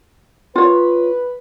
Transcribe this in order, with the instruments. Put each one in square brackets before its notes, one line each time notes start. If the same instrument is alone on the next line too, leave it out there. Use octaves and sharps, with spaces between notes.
[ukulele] F4 C#5 [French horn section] B4